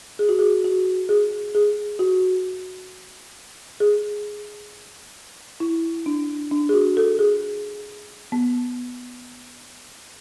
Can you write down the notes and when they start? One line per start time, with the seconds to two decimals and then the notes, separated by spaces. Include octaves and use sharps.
0.19 G#4
0.29 F#4
0.39 G#4
0.64 F#4
1.09 G#4
1.55 G#4
1.99 F#4
3.80 G#4
5.60 E4
6.06 D4
6.51 D4
6.69 G#4
6.74 F#4
6.97 A4
7.19 G#4
8.32 B3